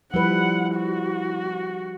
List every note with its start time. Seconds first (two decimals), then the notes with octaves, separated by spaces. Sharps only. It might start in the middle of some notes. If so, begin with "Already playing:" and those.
0.14 F3 G3 E4 B4 F#5
0.77 F#4